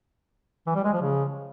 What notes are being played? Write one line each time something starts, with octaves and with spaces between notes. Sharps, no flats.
E3
G3
G#3
F3
C#3